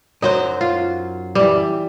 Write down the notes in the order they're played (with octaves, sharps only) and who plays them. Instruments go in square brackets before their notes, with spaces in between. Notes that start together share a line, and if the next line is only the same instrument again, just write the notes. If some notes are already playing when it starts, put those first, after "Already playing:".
[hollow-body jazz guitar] F#2 F#3 C5 [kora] D#4
[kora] F4
E3 G3